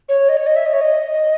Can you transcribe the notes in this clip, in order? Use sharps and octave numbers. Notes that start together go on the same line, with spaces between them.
C#5
D#5
C#5
D#5
E5
D#5
C#5
D#5